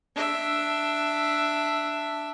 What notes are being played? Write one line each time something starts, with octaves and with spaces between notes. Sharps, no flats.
D4 E5